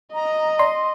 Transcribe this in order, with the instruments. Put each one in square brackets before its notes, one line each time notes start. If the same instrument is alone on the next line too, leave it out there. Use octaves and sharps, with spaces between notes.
[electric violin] D#5 [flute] A#5
[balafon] D5 [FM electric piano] C6